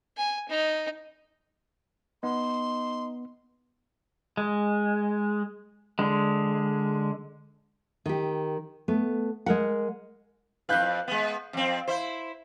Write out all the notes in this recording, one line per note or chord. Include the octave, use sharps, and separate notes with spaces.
G#5
D#4
B3 D#4 C6
G#3
D3 G#3
D#3 G4
A3 B3
G#3 A#4 F#5
F2 B4 F5 F#6 G6
G#3 B3
F2 C4
E4 C5